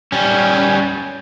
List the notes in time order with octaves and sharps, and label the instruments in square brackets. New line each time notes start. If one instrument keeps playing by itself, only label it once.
[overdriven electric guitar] G3 C#4